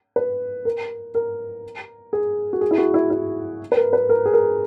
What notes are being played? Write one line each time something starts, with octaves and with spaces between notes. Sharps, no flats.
B4
A#4
A#4
G#4
F#4
G#4
E4
F#4
E4
E4
B4
A#4
B4
A#4
G#4
A#4